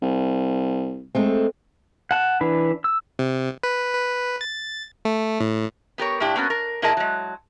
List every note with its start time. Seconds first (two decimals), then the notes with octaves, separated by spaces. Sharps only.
0.02 C2
1.15 G#3 A3 C4
2.11 F#5 A5
2.41 E3 D4 B4
2.84 E6
3.19 C3
3.63 B4
3.93 B4
4.41 A6
5.05 A3
5.40 A2
5.98 B3 G4 A#4 C#5
6.20 A#2 D4 E4 G4
6.36 A#3 B3 C#4 F#4
6.50 A#4
6.82 A#2 E4 G#4 A#4 D#5 A5
6.97 F#3 G#3